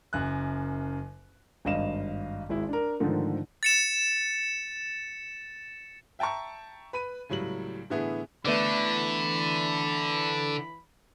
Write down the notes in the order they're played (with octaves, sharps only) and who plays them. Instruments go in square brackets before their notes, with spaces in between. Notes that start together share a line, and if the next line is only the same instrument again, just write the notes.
[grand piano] F#1 F#2 F#6
G#1 G2 D#5 F5 E7
G#1 G#3 E4
D4 A#4
G#2 D3 D#3 F3 A3
[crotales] A6 C#7 E7
[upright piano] E5 G5 A5 A#5 C#6
B4 B5 D#7
C#2 A2 F#3 G3 F#7
A2 D3 E3 B3 E4 G#4
[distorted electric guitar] D3 [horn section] E3 B5 [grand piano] A3 B3 D4